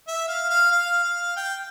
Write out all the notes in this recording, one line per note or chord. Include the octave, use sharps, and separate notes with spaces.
E5
F5
F5
F5
F5
G5